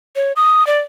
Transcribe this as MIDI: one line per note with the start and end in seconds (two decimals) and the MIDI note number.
0.16 0.32 73
0.36 0.66 87
0.67 0.80 74